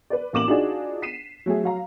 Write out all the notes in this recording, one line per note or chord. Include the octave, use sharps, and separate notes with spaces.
B4 D5
A1 A#3 D6 E7 F#7
D4 D#4 F4 F#4 G#4 D5
B6 C7 D#7 E7
F#3 A3 F#4 G#4
F#3 F5 A#5